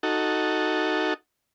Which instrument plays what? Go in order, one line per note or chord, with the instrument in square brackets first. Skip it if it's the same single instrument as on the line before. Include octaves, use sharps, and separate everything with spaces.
[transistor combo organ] D#4 F#4 A4